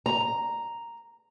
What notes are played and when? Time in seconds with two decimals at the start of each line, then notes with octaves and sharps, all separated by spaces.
0.06 A#5